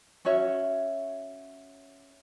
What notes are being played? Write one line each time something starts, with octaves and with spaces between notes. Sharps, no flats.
C#4 F#4 C#5 E5